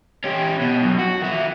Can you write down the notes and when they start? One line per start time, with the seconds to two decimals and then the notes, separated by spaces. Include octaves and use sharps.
0.24 C#4 G4
0.61 B2
0.83 F#2
0.99 F#4
1.22 D#3 E5